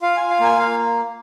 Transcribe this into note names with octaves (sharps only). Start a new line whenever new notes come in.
F4 F5
F4 G#5
F5
A#3 G#5
A#3 F5